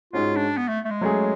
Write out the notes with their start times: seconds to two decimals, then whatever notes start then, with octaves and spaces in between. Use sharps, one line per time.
0.13 G#2 G#3 C#4 F4 F#4
0.36 D4
0.58 B3
0.68 A3
0.85 A3
0.91 G#3
1.01 F#3 A3 C#4 G#4